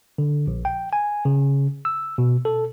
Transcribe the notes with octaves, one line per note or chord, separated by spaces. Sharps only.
D3
A#1
G5
G#5
C#3
E6
B2
A4